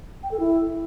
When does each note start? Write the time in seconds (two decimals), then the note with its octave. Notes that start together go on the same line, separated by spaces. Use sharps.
0.23 G5
0.31 A4
0.40 E4